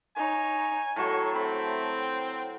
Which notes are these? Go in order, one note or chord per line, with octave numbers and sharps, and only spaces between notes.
D#4 C#5 G#5
A2 F#3 A4 C#6
A3 C4 B5
G5